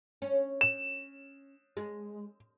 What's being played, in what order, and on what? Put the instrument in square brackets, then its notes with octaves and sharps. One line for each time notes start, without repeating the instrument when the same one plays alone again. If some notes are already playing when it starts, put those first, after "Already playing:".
[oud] C#4
[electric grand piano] E7
[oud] G#3